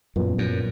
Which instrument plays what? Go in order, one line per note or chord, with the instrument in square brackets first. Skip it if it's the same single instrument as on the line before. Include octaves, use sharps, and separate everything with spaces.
[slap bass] F#2 [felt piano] A#2 F3 B3
[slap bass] F#2